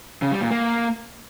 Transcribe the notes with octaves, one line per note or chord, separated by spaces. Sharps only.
C#3
G3
A#2
A#3